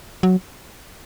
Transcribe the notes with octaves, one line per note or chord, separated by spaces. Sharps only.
F#3